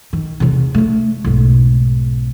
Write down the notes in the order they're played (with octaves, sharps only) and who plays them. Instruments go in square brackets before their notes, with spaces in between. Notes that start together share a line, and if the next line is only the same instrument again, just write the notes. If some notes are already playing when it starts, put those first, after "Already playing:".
[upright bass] D#3
E2 C3
A3 D4
B1 G#2